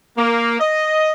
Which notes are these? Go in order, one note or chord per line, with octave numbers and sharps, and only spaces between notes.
A#3
D#5